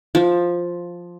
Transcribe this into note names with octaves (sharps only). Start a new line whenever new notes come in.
F3